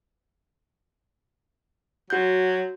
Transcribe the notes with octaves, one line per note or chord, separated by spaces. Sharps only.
F#3 F#4 G6